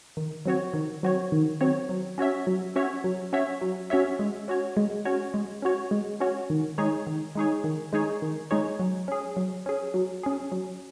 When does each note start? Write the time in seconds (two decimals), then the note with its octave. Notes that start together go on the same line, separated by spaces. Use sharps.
0.17 D#3
0.45 F#3 C4 F#4 C#5
0.74 D#3
1.03 F#3 C4 F#4 C#5
1.32 D#3
1.61 F#3 C4 F#4 C#5
1.89 F#3
2.18 C#4 F#4 C#5 E5
2.47 F#3
2.76 C#4 F#4 C#5 E5
3.04 F#3
3.33 C#4 F#4 C#5 E5
3.61 F#3
3.90 C#4 F#4 C#5 E5
4.19 G#3
4.48 C#4 F#4 C#5
4.77 G#3
5.05 C#4 F#4 C#5
5.34 G#3
5.62 C#4 F#4 C#5
5.91 G#3
6.20 C#4 F#4 C#5
6.50 D#3
6.78 G#3 D#4 G#4 C#5
7.07 D#3
7.35 G#3 D#4 G#4 C#5
7.64 D#3
7.93 G#3 D#4 G#4 C#5
8.22 D#3
8.51 G#3 D#4 G#4 C#5
8.79 F#3
9.08 C#4 G#4
9.37 F#3
9.66 C#4 G#4
9.94 F#3
10.23 C#4 G#4
10.52 F#3